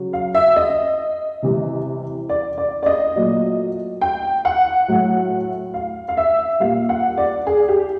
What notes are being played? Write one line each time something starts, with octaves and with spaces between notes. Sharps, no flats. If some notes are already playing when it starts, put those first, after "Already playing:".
Already playing: C#3 F#3
F5
E5
D#5
C3 E3 G3
D5
D5
D5
D#5
A#2 F#3 A3
G5
F#5
A2 F#3 A3
F5
F5
E5
A#2 G3 F5
F#5
D5
G#4
G4